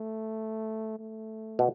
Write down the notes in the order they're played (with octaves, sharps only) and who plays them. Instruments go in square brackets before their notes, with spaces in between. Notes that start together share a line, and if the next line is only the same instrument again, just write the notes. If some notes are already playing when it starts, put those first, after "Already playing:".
Already playing: [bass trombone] A3
A3
[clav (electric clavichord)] B2